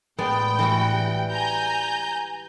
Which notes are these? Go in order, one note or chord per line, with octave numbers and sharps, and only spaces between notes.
A1 G#3 B3 D5 G5
E3 G3 F#4
G#5 A#5 G6